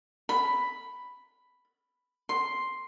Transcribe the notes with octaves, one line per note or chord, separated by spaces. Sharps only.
B5
C6